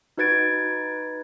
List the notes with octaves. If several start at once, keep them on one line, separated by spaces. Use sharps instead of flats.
D#4 F#4 B4 G#6 A6 D7